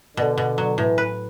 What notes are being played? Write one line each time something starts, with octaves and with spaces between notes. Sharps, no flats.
B2 D3
B2
F#3
A2 E3
B4